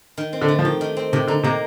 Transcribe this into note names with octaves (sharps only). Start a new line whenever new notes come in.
D#3
C4
D3
A3
F3
D#3 G4
D#3
C4
C3 D#3
D3 D#4
C3 A#3